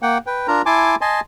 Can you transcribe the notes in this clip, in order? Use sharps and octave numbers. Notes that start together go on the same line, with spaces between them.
A#3 F#5 G5
B4 G5
D4 F4 A#4 A#5
E4 G#5 A5 C6 D6
D#5 G#5 A5 C6